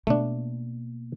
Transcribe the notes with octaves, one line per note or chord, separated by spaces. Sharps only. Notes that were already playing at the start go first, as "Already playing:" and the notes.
B2 A3 A#3 D4